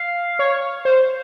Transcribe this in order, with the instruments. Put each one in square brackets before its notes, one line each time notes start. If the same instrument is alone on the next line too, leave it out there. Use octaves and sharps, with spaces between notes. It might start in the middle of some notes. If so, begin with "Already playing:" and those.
Already playing: [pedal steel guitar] F5
[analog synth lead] C#5
C5